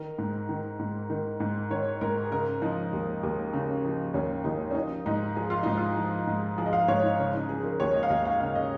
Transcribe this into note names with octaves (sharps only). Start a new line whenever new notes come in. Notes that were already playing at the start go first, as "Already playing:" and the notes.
Already playing: D#3 A#4
G#2
D#3
G#2
D#3
G#2
D#3 C#5
G#2 A#4
G#4
C#3 A#4
F3 D#4
D#2
D#2
C#3
F3
D#2 C#4
D#2 D#4
C#4
F3 D#4
G#2 D#4
F3 G#4
F4
G#2 D#4
F4
F3
G#2
F3 G#4
D#5
F5
G#2 C#5
D#4
C#3 C#4
D#4
F3 G#4
G#4
A#4
D#2 C#5
D#5
F5
D#2 D#5
F5
C#3 F5
D#5